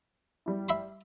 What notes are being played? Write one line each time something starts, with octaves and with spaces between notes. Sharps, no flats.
G3 E4
E5 B5 C6